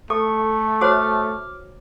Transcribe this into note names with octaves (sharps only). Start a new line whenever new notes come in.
A3 A4 C#6
F#4 C5 C#5 D6 F6